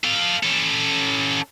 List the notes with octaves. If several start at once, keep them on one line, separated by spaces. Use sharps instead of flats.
A4 F5
C#4 A4